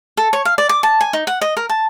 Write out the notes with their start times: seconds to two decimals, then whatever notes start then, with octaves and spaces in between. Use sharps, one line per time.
0.17 A4
0.33 C#5
0.45 F5
0.58 D5
0.69 D6
0.83 A5
1.01 G#5
1.13 D#4
1.27 F#5
1.41 D#5
1.57 A#4
1.69 A5